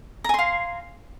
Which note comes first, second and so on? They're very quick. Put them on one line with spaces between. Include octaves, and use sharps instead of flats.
A#5 G#5 C6 F5